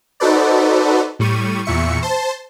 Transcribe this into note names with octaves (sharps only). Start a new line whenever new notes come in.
D#4 F#4 A4 B4 C5 D5
A2 G3 C#6 D#7
E2 A#2 E5 C#6 C#7
C5 A5